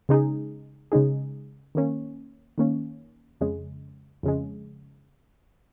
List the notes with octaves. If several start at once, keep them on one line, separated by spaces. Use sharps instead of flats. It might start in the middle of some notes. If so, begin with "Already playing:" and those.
C#3 G#3 D#4 G#4
C#3 G#3 D#4 G#4
D#3 A#3 C#4
D#3 A#3 C#4
F2 C#3 G#3
F2 C#3 G#3